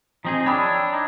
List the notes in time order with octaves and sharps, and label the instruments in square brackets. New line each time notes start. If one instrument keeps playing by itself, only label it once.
[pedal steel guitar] F3 C4 G#4 [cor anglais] D#4
[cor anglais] D4 [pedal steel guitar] C#5 E6 [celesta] G5 B5 D#6
[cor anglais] D#4